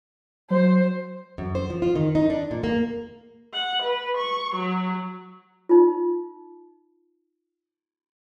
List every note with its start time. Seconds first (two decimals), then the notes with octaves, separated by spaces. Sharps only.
0.50 F#3 C5
1.38 F#2
1.55 C5
1.70 F3
1.82 F4
1.95 D#3
2.15 D#4
2.30 D4
2.51 A#2
2.64 A#3
3.53 F#5
3.82 B4
4.17 C#6
4.55 F#3
5.69 D#4 F4